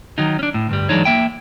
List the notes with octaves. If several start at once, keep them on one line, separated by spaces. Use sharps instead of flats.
D#3 F#3 D#4
C#4 D4
A2
D2 G2 G3
E3 F#3 G#3 D4 D#4 C#5
A#3 E5 G5